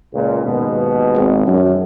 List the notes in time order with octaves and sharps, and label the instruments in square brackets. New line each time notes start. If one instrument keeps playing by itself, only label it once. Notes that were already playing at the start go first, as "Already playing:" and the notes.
[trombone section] C#2 A#2
D#2 G#2 B2
[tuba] G#1
F#2